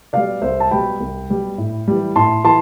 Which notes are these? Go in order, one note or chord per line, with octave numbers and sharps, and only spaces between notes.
B2 G3 D5 F5
C2 C5 E5
A5
B2 G3 G5 B5
C2
B2 G3
A2
E3 G3
A2 A5 C6
E3 A5 C6